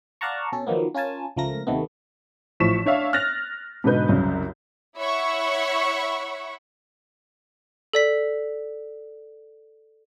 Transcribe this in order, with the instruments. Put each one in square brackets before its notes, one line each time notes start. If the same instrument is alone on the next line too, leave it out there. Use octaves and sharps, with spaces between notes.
[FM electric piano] D5 F5 F#5 A5 A#5 C#6
B2 C#4 A4
D#3 F3 F#3 A#3 B3
C#4 F4 A#4 G#5 A5
C#2 F3 A3 A#4 A#6
D#2 C3 D#3 A3 B3
[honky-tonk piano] A1 F3 E4 C#6 B6 E7
D4 C#5 E5 F5
F6 F#6 A6 A#6 F7
G#2 B2 D3 D#4 B4 G6
C2 F#2 C#3
[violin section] E4 C#5 E5 F#5 B5 C#6
[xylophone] A4 D5 B6